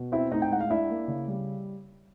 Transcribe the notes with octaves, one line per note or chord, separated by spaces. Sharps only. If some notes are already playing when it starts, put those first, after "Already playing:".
Already playing: B2
C4 E4 E5
A2 D#4 D#5
G5
G#3 F#5
F5
D4 E4 E5
A#3
C#3
G3